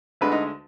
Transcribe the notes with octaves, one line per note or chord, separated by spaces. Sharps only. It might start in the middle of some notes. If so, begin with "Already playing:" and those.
D2 D3 G#3 B4
D#4